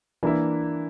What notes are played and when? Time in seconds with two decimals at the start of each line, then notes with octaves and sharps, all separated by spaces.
0.23 E3 A#3 D4 E4